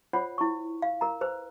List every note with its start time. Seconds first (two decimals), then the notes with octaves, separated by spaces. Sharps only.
0.13 F4 C5 C#5 F#5 B5
0.38 E4 C#6
0.82 F5
1.01 A#4 A#5
1.21 B4 C5